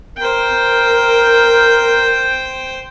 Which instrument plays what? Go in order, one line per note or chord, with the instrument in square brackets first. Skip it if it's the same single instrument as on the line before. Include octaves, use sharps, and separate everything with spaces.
[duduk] A#4 [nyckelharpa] C5 G5